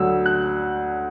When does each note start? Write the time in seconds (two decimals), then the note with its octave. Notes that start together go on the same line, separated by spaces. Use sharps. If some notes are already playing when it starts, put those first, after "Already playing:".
Already playing: D2 D3 F#3 E6
0.26 F#6